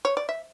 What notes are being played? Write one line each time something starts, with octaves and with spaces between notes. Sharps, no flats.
C#5
D5
E5